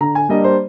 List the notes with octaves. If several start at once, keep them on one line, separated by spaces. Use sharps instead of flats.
D3 A#5
G#5
G3 A#3 D4 D#5
C5